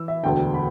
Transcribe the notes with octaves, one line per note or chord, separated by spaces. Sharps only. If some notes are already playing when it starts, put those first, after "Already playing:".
Already playing: E3 E6
E5
E1 D2 D3 G5
B5